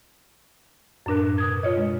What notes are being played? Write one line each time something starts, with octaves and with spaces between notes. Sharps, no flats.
F#2 A2 D4 A#4 F#6
B2 D#6 G#6
F4 C#5 D#5
G#3